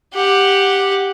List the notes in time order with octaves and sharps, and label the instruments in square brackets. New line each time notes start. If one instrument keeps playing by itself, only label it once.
[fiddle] G4 F#5